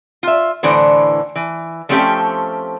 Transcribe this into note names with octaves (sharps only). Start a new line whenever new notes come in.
F4 E5
A2 D3 E3 C5
E3
F3 A3 C4 C#4 G4